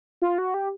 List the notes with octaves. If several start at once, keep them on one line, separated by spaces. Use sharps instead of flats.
F4
F#4
G4